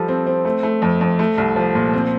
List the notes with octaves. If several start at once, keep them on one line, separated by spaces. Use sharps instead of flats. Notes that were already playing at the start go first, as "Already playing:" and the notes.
Already playing: F3 G3 A4
C4
C4
A3
A3
F2
F2
A3
C2
F3
A#2
C4